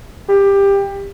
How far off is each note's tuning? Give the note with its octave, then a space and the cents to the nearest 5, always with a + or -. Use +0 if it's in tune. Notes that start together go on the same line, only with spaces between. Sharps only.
G4 +20